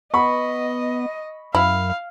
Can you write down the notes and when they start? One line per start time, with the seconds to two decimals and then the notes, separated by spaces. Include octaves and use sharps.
0.14 B3 D#5 B5 C#6
1.55 F#2 E4 F5